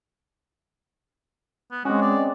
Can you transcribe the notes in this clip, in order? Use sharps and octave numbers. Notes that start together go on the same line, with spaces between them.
B3
G#3 C4 C#4 F#4
D5